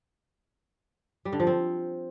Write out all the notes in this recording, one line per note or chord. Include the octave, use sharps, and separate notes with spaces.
G3
D3
F3
C4